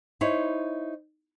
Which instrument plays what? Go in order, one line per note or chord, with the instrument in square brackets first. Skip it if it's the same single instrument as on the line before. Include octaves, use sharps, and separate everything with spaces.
[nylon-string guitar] D#4 E4 C5 C#5